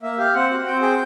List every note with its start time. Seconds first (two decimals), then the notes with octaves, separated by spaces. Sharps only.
0.02 A#3 E5
0.18 G4 F5
0.34 C4 F#5
0.51 F#4
0.65 C4 G5
0.82 G#4 G5